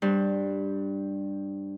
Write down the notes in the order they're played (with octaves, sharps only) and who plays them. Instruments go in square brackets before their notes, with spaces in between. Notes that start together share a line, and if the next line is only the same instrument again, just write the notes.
[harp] G2 C5